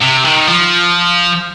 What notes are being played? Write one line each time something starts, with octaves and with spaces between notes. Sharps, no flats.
C3
D#3
F3